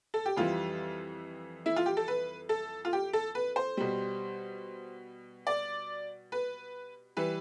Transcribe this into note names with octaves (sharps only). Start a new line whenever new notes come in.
A4
G4
F2 E3 G3 F4
E4
F4
G4
A4
B4
A4
F4
G4
A4
B4
C5
B2 G3
D5
B4
E3 G3 B4